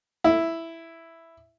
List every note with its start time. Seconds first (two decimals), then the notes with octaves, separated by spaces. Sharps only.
0.24 E4